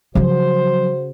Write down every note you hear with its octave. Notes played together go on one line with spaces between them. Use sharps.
C#3 F3 F#3 F#4 C5